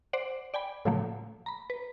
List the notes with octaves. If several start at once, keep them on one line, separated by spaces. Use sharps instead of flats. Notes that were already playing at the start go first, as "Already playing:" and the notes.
C5 D5 F#5
D5 G5 G#5 B5
A2 C#3 F3 F#3 A3 A#3
A#5 B5
B4